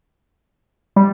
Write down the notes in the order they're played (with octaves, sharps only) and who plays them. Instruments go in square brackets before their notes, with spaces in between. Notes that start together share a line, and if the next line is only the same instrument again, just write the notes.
[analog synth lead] G3